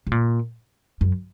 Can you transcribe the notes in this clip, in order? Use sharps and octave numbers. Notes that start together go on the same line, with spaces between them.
C3
A#2
F#2